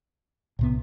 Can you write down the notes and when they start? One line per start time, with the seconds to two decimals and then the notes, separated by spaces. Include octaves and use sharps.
0.59 C2 A2 C3 B3